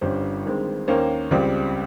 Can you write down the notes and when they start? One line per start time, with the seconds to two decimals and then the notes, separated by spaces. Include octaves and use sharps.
0.01 G1 G2 G3 C#4 C5
0.45 G2 D#3 G#3 C4
0.88 D#2 D#3 A#3 C#4 C5
1.31 C#2 C#3 G3 C4